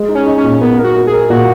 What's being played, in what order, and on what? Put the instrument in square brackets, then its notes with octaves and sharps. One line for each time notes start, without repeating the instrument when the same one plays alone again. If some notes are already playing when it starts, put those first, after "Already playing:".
Already playing: [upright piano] G#3
D#4
[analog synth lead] C#4
[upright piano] D#4
[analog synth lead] C#4
[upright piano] A#2
[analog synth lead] B3 [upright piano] A#4
[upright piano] A#4
[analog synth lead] F#4
[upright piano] A#4
[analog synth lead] G#4
[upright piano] A#4
[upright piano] A#2 [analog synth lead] F#4